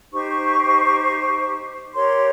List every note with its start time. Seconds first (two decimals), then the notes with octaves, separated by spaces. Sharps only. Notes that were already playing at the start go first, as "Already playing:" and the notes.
0.13 D#4 G4 C5 C#6
1.94 G4 A#4 C#5 C6